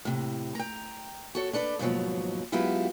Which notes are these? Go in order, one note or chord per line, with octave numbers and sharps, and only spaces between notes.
A2 C3
G5 A#5
F#4 A4 C#5
D4 A4 B4 D5
D#2 G#2 B2 F3 F#3
F#3 G#3 B3 E4 F4 G4